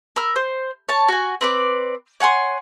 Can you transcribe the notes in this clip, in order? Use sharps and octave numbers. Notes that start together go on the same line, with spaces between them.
A#4 B5 E6
C5
C#5 A5
F#4 G#5
C4 B4 D5
C#5 F#5 G#5 C6